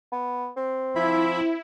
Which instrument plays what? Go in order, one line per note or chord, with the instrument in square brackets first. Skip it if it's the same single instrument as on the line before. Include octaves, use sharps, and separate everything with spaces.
[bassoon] B3
C4
[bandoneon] F3 E5 B5 [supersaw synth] E4